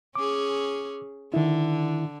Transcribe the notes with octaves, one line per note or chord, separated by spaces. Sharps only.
C#4 G#4 D6
D3 D#3 E4